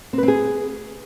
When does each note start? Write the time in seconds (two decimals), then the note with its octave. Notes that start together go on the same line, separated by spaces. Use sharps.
0.13 C4
0.18 B4
0.23 C4
0.28 G#4